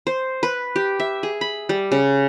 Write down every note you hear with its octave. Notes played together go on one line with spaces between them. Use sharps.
C5
B4
G4
E5
G#4
B5
G3
C#3